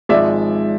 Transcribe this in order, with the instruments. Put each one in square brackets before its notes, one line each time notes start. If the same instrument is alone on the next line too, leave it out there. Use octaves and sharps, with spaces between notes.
[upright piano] G#1 G#2 F3 G#3 D5 E5